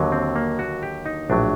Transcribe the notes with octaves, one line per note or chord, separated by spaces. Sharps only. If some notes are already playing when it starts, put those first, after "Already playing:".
Already playing: D#2 D3 F#3
C4
A#3
F#4
G4
D#4
A#1 A2 F#3 D4